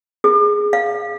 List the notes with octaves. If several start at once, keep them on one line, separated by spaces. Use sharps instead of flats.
G#4
F5